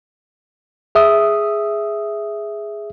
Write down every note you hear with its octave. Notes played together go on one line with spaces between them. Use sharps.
G#4 E5 D#6